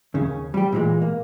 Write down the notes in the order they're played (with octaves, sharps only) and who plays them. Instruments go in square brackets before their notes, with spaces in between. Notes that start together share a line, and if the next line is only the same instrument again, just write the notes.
[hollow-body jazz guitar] D#2 C#3 C#4
G3 G4
A#2 E3 G#3
A#3